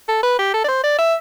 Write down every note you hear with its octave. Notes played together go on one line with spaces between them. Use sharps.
A4
B4
G4
A4
D5
C5
D5
E5